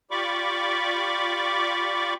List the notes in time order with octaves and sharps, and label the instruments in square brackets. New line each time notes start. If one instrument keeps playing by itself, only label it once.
[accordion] F4 G4 D5 B5 C#6 D6